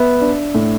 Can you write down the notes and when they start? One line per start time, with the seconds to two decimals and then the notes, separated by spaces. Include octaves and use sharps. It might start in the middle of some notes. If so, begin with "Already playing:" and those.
Already playing: B3 E5
0.21 D4
0.55 A2